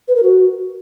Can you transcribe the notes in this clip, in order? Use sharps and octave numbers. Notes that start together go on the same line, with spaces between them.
B4
A#4
F#4